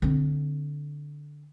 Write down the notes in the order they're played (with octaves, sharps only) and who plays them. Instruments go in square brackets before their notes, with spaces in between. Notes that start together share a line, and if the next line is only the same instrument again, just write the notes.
[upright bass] D3 C4